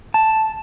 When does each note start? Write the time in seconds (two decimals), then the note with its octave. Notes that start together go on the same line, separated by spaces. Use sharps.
0.14 A5